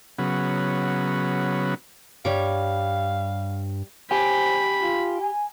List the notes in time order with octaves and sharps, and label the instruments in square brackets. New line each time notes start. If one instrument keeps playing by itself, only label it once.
[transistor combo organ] C#3 F#3 B3
[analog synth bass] G2 [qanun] G3 C#5 D6 [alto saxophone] F5
[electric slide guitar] G4 [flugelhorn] C5 [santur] G#5 [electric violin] B5
[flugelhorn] F4
G#5